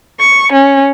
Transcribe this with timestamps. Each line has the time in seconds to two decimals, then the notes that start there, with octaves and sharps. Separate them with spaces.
0.19 C#6
0.52 C#4